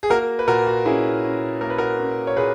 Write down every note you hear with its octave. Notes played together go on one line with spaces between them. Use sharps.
G#4
A#3 F#4 A#4
B4
A#2 F#4 A#4
F#4
C#4 E4 G#4
C#4
A#3 A#4
B4
F#4 A#4
C#4
C#5
A#2 G#4 B4